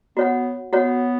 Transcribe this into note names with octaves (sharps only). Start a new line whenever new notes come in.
B3 F#4 C#5 F#5
B3 F#4 C#5 F#5